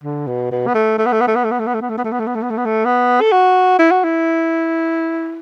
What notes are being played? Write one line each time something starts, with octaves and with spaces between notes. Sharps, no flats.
D3
B2
B2
B3
A3
A3
B3
A3
B3
A3
B3
A3
B3
A3
B3
A3
B3
A3
B3
A3
B3
A3
B3
A3
B3
A3
B3
A3
B3
A4
F#4
E4
F#4
E4